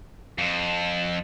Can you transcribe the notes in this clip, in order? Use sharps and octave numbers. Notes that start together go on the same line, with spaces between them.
F2